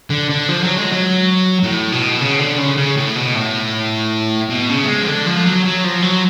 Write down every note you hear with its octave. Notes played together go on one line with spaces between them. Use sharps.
D3
D3
F3
F#3
G#3
F#3
A2
B2
C#3
D3
C#3
C#3
A2
B2
A2
B2
C#3
A3
G#3
F3
D3
F3
F#3
F#3
F3
F#3